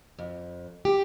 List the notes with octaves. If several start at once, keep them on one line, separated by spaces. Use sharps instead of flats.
F2
G4